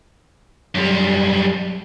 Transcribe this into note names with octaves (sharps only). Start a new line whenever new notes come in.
F#2 G3